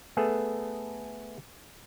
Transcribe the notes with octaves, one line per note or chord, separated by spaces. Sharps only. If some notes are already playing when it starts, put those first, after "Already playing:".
A3 B3 G#4 A4